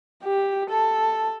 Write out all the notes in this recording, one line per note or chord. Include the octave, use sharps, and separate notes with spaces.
G4
A4